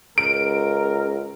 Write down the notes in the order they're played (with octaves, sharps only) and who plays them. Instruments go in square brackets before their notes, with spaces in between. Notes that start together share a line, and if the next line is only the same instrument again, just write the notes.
[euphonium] C#2 [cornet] A#4 [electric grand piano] D7